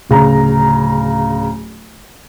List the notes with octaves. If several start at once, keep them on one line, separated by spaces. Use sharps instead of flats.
D1 C#3 A#5